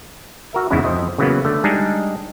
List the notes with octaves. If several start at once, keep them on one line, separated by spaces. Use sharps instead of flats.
F#4 A#4 E5
E2 G#2 C#3 G#3 C#4 E4
F2 C5 D#5
C#3 E3 F#3 A#3 B3
D3 A3
G3 G#3 D4 D#4 G#4